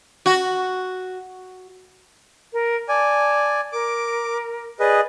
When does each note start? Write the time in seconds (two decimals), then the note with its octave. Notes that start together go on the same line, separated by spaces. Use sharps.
0.26 F#4
2.53 A#4
2.89 D5 G#5 A5
3.72 A#4 D6
4.80 G#4 B4 D5 D#5